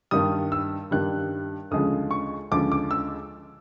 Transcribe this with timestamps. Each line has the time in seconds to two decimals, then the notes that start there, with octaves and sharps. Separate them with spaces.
0.11 G2 D#3 G3 D#6
0.52 E6
0.91 G2 D#3 G3 F#6
1.71 D2 C#3 F3 G#3 D#6
2.11 C#6
2.51 D2 C#3 F3 G#3 D6
2.72 D6
2.91 E6